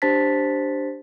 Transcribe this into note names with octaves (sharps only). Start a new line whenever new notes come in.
D4 G4 C5 A5 A6 B6